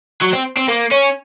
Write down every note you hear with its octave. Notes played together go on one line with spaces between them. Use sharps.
F#3
C4
C4
A#3
C#4